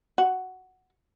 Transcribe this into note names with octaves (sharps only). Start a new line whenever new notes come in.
F#4